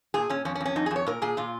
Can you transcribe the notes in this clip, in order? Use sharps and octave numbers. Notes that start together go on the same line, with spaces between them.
A#2 G#4
A#2 C#4
F2 C#4
C#4
F2
C#4
F2 D#4
G#4
F2
C#5
A#2 A#4
A#2 G#4
A#2 F4